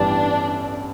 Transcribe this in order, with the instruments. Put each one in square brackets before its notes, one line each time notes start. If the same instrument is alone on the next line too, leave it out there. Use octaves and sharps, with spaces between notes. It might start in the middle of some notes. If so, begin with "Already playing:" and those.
Already playing: [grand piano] A1 G2 E3 G3 B3 [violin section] D4